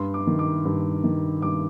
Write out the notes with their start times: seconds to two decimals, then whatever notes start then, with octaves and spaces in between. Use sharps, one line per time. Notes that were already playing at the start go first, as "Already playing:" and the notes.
Already playing: G2 C6
0.14 D6
0.27 D#3
0.39 D6
0.65 G2
1.04 D#3
1.42 G2 D6